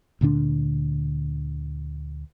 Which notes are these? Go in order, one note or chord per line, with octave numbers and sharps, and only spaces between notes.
D2 A#2 D3 D4